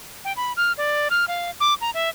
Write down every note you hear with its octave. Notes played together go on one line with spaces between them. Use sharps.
G5
B5
F6
D5
F6
F5
D6
A#5
E5